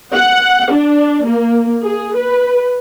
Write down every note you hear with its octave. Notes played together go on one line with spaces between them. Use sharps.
F#5
D4
A#3
G#4
B4